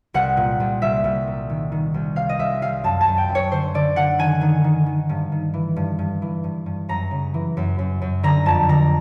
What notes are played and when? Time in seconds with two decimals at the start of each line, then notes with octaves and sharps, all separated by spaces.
0.14 C2 F#5
0.37 A#2
0.60 C2
0.82 C2 E5
1.04 C2
1.27 A#2
1.49 D#3
1.72 D#3
1.94 C2
2.16 C3 F5
2.29 D#5
2.39 C2 E5
2.62 C2 F5
2.84 F#2 A5
3.01 A5
3.06 F#2
3.18 G5
3.29 F#2
3.35 C#5
3.51 D3 C5
3.74 D3 D5
3.96 D3 F#5
4.19 D#3 G#5
4.41 D#3
4.64 D#3
4.86 D#3
5.09 G2
5.32 D#3
5.54 E3
5.76 G2
5.99 G2
6.22 E3
6.44 G2
6.66 G2
6.89 F#2 A#5
7.11 C#3
7.34 E3
7.57 F#2
7.79 F#2
8.02 F#2
8.23 D3 A#5
8.46 F2 A5
8.69 D3 A#5